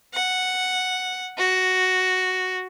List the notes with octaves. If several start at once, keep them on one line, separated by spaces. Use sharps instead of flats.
F#5
F#4